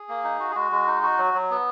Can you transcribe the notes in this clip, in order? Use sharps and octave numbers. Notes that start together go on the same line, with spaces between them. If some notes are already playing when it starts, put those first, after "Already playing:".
Already playing: G#4
A#3
D#4
F#4
G#4
G#3 F#4
G#3
D#4
F#4
F#3
F#3
B3